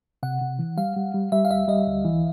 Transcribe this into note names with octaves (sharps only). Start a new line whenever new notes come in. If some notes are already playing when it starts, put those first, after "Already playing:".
C3 F#5
C3
E3
G3 F5
G3
G3
G3 E5
F5
D2 E5
G3 D#5
D2
E3